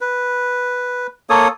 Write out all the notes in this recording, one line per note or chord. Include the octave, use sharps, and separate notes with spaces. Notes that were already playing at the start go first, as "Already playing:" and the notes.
B4
A#3 A4 C#5 D#6